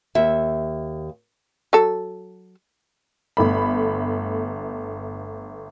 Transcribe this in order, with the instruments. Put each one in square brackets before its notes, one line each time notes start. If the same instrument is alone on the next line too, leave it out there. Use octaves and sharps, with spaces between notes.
[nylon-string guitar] D#2 E5
[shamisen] F#3 A4
[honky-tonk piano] G1 A3 B5